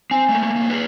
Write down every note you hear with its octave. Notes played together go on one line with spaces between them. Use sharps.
C4 G#5
A3 A#3
D5
C2 A#3
G#4 B4